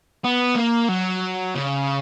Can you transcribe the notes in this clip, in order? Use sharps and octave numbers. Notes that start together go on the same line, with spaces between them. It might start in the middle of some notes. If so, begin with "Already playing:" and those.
B3
A#3
F#3
C#3